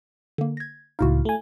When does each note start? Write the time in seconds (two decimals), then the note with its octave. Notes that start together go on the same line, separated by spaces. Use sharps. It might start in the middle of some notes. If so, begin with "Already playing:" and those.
0.38 D3 A#3
0.57 G#6 A#6
0.99 C#2 A2 D#4 E4 F#4 F5
1.25 A3 G#5